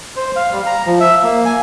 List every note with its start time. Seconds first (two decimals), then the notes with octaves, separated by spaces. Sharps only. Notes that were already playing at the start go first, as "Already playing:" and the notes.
0.16 C5
0.36 F5
0.52 G3
0.66 A#5
0.86 F3
1.00 E5
1.23 A#3
1.45 G#5